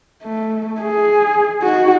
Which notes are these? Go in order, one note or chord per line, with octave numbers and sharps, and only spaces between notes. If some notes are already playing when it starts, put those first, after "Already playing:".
A3
G#4
D#4 F#4